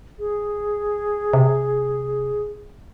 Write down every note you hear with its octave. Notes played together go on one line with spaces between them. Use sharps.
G#4
C3